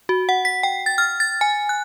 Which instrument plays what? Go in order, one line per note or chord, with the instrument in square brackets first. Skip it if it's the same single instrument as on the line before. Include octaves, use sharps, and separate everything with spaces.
[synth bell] F#4
F#5
B6
G5
A6
F6
A6
G#5
F#6